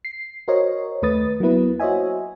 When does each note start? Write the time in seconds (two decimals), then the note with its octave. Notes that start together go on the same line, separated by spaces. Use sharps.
0.05 C7
0.48 F#4 A#4 C5 C#5 D#5
1.02 D#2 A3 B4 D#6 A6
1.40 F#3 A#3 B3 E4 B4
1.80 F#4 C5 C#5 D#5 E5 G#5